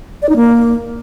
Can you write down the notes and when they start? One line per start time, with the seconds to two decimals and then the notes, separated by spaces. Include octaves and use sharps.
0.22 D5
0.29 D#4
0.36 A#3